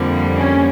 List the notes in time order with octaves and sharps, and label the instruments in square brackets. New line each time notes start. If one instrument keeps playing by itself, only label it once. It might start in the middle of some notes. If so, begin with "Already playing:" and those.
Already playing: [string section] F2 D3 G3 A#3
[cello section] C#4